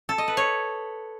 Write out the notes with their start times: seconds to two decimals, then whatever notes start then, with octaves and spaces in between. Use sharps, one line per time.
0.09 A4
0.18 D#5
0.28 B4
0.37 C#5